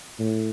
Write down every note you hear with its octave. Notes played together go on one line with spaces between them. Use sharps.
A2